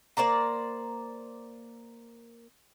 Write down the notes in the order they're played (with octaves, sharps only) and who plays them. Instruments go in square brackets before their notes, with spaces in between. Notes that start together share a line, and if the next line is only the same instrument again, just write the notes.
[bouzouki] A#3 C5 D5 A#5